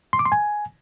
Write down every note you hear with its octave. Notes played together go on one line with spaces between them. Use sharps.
C6
D6
C6
G#5